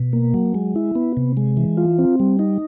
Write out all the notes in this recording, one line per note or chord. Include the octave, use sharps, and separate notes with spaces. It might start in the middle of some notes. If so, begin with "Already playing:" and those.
Already playing: B2
A#3
F#3
G#3
E4
B3
C3
G#3
E3
F4
C4
G3
D#4